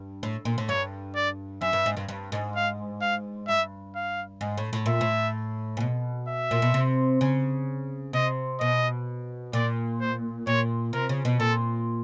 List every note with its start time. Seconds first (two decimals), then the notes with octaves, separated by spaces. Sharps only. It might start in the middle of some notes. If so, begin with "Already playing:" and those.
Already playing: G2
0.23 A2
0.45 A#2
0.58 A2
0.69 G2 C#5
1.15 D5
1.61 F#2 E5
1.73 G2
1.86 G#2
1.97 G2
2.08 G2
2.32 G#2
2.56 F5
3.02 F5
3.48 G2 E5
3.95 F5
4.41 G#2
4.58 A2
4.73 A2
4.86 A#2 E5
5.01 A2
5.77 A#2
5.80 B2
6.28 E5
6.51 A#2
6.62 B2
6.74 C3
7.21 C#3
8.13 C3 D#5
8.60 B2 D#5
9.53 A#2 D5
10.00 C5
10.47 A#2 C#5
10.93 C3 A#4
11.09 C#3
11.25 B2
11.40 A#2 A4